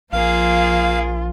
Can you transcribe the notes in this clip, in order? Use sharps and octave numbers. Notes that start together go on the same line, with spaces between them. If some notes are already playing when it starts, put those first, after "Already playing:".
A#1 F3 A#3 F4 G#4 F5